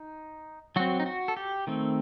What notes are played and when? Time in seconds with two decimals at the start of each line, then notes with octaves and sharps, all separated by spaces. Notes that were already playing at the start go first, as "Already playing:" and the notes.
Already playing: D#4
0.76 F#3 C4 F#4
1.00 D#4
1.06 F#4
1.28 A4
1.37 G4
1.67 D#3 A3 C4